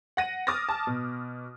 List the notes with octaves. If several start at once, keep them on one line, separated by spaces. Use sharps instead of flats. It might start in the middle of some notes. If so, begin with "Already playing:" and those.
F#5 A#6 D#7
D6 D#6 F6 A6 A#6
A5
B2